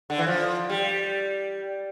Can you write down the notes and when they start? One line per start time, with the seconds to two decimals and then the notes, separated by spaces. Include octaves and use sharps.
0.10 D3
0.18 E3
0.27 F3
0.70 G3